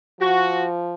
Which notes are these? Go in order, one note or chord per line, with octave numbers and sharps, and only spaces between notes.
F3 F#4